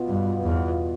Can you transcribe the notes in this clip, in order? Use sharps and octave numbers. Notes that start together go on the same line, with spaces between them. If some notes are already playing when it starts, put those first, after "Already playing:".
Already playing: B2 B3 F4
G2
E2